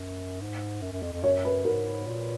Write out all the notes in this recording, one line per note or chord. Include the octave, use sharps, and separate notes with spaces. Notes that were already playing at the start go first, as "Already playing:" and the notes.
Already playing: F#2
G#2
F#2
F#2
F2
F2
F#2 C#5
B4
G#2 A#4
A#2